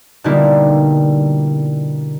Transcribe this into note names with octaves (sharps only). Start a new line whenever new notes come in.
B2 D3 G3 A#3 D#4 E4